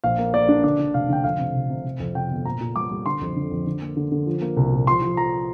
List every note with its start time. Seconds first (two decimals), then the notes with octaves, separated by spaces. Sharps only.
0.04 A#1 F5
0.18 A#3
0.34 A#3 D5
0.49 D4
0.64 D3 D5
0.79 D3
0.94 F1 F5
1.09 D3 G5
1.24 F2 F5
1.39 C3
1.55 F1
1.70 C3
1.84 C3
2.00 F2
2.15 C3 G5
2.30 G1
2.45 A#2 A#5
2.61 A#2
2.76 G3 D6
2.91 G3
3.06 D3 C6
3.21 F2
3.36 D3
3.51 F2
3.67 D3
3.81 A#3
3.97 D3
4.12 D3
4.26 F3
4.42 A#3
4.57 C2
4.72 A#2
4.87 F3 C6
5.02 F3
5.17 F3 A#5